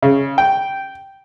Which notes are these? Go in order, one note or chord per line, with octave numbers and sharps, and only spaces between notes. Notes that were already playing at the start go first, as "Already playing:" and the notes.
C#3
G5